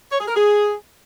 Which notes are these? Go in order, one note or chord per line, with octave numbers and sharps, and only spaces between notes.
C#5
G#4
A#4
G#4